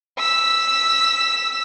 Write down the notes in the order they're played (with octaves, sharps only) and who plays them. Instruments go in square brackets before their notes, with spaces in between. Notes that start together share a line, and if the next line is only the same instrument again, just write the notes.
[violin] E6 B6